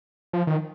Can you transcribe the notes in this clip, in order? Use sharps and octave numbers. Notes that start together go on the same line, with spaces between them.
F3
D#3